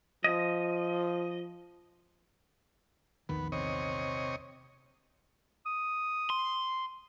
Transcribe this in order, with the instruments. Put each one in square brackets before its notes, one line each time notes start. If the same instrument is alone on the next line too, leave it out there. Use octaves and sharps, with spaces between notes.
[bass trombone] F3 [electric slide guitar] D#5
[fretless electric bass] A#1 E2 D#3 [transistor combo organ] B3
[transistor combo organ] C3 C#5 D#5
[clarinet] D#6
[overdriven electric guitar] C6